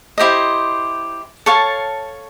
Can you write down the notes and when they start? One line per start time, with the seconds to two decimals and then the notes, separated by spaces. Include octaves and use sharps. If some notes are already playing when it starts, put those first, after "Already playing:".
0.18 E4 G4 C5 D#5
1.46 A4 C#5 F5 A5